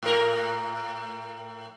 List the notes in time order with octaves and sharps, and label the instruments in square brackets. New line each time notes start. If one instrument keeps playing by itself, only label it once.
[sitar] A2 A#4